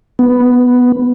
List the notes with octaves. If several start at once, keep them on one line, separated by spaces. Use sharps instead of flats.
B3